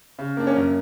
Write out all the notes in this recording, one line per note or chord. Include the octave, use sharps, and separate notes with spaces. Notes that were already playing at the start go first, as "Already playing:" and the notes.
C#3
A#3 D4
C#4
F#2